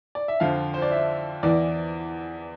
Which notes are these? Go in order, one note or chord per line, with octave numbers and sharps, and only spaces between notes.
D5
E5
F2 D3 F3 F5
C5
D5
E5
E2 E3 D5